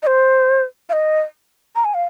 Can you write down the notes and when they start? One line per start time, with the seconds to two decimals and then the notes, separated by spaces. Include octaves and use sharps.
0.02 D#5
0.07 C5
0.89 F5
0.93 D#5
1.76 A#5
1.85 G#5
1.94 F5